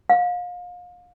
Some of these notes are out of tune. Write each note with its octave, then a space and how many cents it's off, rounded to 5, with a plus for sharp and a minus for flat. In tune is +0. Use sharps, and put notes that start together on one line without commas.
F5 +35